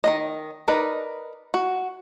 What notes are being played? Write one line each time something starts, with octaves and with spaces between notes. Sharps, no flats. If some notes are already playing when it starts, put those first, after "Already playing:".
D#3 C4 D#5
D#4 A#4 B4 D5 D#5
F#4